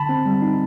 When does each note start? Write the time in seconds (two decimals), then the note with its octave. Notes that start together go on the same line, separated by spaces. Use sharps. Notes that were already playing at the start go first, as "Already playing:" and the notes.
Already playing: D3 A5 B5
0.09 C4
0.26 G3
0.42 D#4